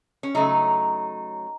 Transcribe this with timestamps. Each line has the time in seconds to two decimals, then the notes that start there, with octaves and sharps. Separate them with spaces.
0.23 C#4
0.35 C#3 F#3 A3 D#4